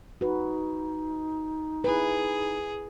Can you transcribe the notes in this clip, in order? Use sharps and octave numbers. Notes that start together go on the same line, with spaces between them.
D#4 F#4 B4
E4 G#4 B4